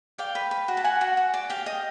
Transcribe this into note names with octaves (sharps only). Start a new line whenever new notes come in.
D5 F5 G5
B4
B4
F#4
A5
F#4 F#5 G#5
F#4
F#4
D5
G4 F5 G5
D#5